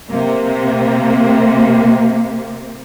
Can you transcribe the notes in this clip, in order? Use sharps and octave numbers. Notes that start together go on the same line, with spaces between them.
C3 A#3